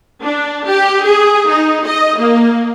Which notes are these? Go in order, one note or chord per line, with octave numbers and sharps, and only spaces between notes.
D4
G4
G#4
D#4
D#5
A#3